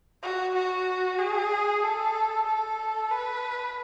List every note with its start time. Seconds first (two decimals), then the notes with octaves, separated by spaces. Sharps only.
0.23 F#4
0.55 F#4
1.19 G#4
1.83 A4
2.47 A4
3.11 B4